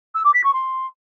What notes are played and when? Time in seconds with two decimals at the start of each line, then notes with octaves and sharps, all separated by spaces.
0.15 E6
0.24 D6
0.34 B6
0.44 C#6
0.53 C6